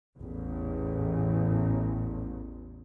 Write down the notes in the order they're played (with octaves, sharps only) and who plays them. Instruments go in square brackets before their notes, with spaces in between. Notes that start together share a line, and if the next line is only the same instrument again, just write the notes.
[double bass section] A1 E2